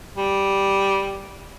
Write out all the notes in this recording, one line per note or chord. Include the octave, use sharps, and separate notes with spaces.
G3